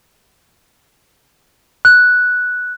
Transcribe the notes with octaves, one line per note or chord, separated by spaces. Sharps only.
F#6